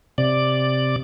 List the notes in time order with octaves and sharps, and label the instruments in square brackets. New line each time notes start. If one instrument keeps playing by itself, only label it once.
[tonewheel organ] C3 D5